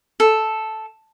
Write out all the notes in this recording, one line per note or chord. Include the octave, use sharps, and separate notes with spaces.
A4